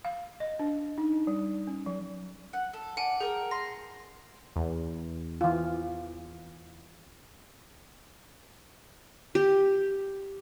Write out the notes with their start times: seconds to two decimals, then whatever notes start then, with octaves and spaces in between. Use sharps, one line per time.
0.05 F5
0.40 D#5
0.59 D4
0.98 D#4
1.27 G3
1.67 C#4
1.86 F#3
2.53 F#5
2.73 A4
2.97 D5 F#5 G#5
3.20 G#4 A#4 G5
3.51 C6 A#6
4.56 E2
5.41 E3 F4
9.35 G4